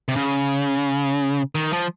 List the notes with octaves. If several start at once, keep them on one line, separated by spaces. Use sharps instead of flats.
C3
C#3
D#3
F3